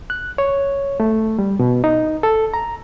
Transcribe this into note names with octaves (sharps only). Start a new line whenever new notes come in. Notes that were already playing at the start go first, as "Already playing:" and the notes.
F#6
C#5
A3
G3
B2
D#4
A4
A#5